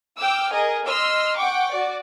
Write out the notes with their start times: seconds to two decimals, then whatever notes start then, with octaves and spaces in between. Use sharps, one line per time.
0.18 G5 D6 E6 F6
0.51 G#4 A#4 D#5
0.86 D#5 C6 E6 F6
1.36 F#5 G5 C#6 D6
1.71 F#4 D5